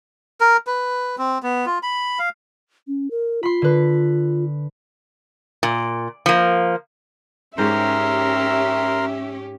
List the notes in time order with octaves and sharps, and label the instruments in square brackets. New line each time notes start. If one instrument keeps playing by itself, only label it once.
[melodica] A#4
B4
C4
B3
F4
B5
F5
[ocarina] C#4
A#4
[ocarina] F4 [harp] B5 C6
[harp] D3 B4
[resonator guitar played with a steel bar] A#2
F3 A#3
[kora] G#2 C5 [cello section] C#4 G4 [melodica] A#4 A#5 C6 [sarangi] E5